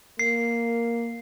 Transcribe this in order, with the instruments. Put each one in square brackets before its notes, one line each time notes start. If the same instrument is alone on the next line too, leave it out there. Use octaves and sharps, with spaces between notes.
[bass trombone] A#3 [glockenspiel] C7